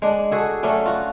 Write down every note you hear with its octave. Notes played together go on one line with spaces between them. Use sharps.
G#3 D4
F#4 G#4 A4
F#3 A3 C#4 D4
F4 F#4